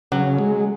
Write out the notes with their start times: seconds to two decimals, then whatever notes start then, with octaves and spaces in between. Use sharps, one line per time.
0.12 C#3 F#3
0.38 G#3